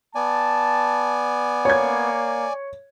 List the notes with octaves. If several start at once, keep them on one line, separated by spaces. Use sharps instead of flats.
B3 D5 G#5 A5
A#3 C#5 G#6